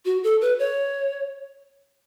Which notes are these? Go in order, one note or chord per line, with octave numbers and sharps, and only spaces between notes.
F#4
A4
B4
C#5